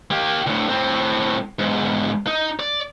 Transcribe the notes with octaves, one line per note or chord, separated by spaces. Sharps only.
A#3 G4
D2 A2
A2 C4
E2 G#2
D#4
D5